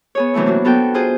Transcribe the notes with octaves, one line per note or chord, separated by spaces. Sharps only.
B3 G#4 C#5
C3 E3 F#3 A3 E4
A#3 D4 F#4
B3 F#4 A4 G5
F4 G#4 C5